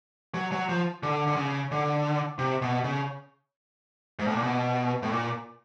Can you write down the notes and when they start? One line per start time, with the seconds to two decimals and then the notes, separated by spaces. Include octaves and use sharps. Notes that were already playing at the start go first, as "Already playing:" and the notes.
0.34 F#3
0.52 F#3
0.69 F3
1.03 D3
1.27 D3
1.36 C#3
1.72 D3
2.39 C3
2.62 B2
2.84 C#3
4.19 G#2
4.27 A2
4.35 A#2
4.43 B2
5.03 A2
5.12 A#2